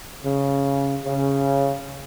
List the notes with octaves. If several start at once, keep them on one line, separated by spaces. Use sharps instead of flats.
C#3
C#3